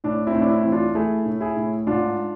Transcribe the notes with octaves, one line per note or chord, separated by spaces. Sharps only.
A2 D4
C4 E4
A2
D4
C4 E4
E3
D4 F4
A3 E4 G#4
A2
E4 G#4
A2
G#2 D4 F4